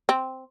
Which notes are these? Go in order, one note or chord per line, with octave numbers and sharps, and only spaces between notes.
C4